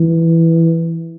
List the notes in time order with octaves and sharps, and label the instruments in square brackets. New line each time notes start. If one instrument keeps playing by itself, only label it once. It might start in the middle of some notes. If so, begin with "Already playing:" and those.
Already playing: [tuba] E3